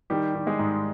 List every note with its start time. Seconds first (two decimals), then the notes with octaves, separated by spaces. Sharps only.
0.10 D#3 G3 G4
0.35 D#3
0.47 G#3 G#4
0.59 G#2